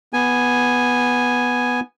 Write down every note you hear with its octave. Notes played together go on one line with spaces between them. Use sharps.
B3 G#5